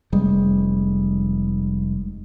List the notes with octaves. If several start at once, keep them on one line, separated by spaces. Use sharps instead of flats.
F1 G3 G#3